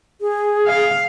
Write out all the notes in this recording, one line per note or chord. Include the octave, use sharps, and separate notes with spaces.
G#4
F5